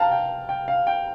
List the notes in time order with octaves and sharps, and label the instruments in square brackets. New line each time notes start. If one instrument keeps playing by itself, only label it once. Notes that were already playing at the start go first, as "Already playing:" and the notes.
Already playing: [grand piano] F5 G5 A5 A#5
G5
G5
F5
G5